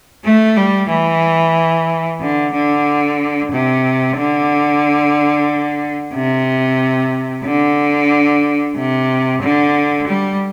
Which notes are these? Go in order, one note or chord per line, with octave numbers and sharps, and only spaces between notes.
A3
G3
E3
D3
D3
C3
D3
C3
D3
C3
D3
G3